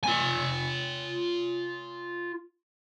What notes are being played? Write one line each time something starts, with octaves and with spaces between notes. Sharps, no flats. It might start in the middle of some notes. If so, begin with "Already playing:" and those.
F4 G#5